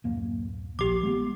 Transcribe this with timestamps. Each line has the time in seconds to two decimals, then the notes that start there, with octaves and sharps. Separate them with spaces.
0.04 D1 F#2 A#3
0.79 A#1 G4 D6
1.03 G#3 A#3 B3